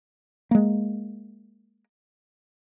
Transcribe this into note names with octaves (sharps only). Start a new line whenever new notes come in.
G#3 A#3